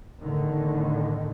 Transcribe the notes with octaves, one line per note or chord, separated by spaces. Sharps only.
E2 A2 D3 D#3